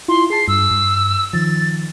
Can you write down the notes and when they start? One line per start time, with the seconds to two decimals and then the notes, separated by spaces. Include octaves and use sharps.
0.08 E4 F4 C6
0.30 G#4 A5 C7
0.48 G2 E6
0.71 G2
1.33 D#3 F3 A6